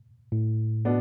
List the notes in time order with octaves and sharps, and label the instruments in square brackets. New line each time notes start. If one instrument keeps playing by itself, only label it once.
[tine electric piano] A2
[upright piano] B2 B3 D4